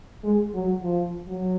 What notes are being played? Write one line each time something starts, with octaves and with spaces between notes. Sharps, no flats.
G#3
F#3
F3
F#3